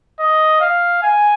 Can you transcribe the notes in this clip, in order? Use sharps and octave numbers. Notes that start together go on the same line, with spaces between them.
D#5
F5
G#5